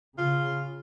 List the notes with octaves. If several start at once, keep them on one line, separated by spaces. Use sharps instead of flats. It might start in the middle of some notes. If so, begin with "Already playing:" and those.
C#3 F4